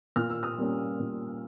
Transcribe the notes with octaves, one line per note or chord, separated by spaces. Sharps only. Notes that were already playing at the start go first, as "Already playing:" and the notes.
A#2 F6
E6
D#6 F6
G3 A#3 C#4
A#2